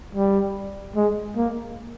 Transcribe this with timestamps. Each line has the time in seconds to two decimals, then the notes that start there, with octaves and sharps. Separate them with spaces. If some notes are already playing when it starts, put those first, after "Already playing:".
0.15 G3
0.96 G#3
1.37 A#3